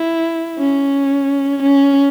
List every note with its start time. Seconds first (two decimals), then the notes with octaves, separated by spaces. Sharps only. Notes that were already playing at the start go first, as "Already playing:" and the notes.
Already playing: E4
0.59 C#4
1.63 C#4